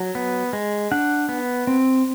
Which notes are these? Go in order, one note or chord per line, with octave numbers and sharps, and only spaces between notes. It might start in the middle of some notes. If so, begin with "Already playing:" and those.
Already playing: F#3
B3
G#3
D4 F#5
B3
C4